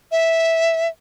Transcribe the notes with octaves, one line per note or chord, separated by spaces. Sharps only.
E5